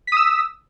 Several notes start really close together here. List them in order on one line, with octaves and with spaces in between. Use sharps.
B6 D#6 E6